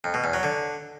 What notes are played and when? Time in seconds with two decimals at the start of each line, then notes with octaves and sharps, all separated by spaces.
0.04 F2
0.14 B2
0.24 E2
0.33 F#3
0.43 D3